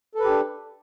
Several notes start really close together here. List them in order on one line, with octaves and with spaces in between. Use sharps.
A4 B4 G4 D4